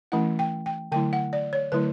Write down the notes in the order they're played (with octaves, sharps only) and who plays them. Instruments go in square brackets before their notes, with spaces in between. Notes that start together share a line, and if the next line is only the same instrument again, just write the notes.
[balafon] E3 A3 C#4 E4 F#5
G5
G5
D3 F#3 A3 E4 G5
F#5
D5
C#5
D3 F#3 A3 E4 B4